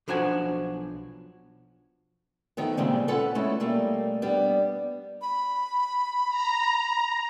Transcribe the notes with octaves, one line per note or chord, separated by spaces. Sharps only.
B1 F3 D4 F#4 G#5
D#3 F3 A3 B3
A#2 C#3 E3 G3 G#3 C4
C#4 F4 A4 B4 F#5
G#3 A3 C#4 E4
B2 G3 A3 A#3
G3 B3 D4
B5
A#5